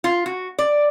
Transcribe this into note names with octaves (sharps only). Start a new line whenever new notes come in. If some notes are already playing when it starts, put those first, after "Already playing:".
F4
F#4
D5